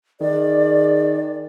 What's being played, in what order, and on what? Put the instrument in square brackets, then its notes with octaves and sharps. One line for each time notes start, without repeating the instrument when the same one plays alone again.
[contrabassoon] D#3 [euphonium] G#4 [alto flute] D5